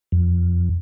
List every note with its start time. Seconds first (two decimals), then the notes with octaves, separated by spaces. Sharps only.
0.12 F2